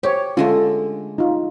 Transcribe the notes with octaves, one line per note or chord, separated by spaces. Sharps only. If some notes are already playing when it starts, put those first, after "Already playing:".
G4 C5 C#5
D3 G#3 A3 C#4 F4
D#4 F4